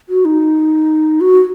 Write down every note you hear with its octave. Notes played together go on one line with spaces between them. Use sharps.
F#4
D#4
F#4